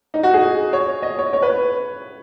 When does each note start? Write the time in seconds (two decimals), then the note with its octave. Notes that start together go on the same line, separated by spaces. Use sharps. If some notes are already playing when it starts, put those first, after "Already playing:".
0.14 D#4
0.23 F#4
0.34 G#4
0.73 C#5
1.02 D#5
1.19 C#5
1.33 C#5
1.42 B4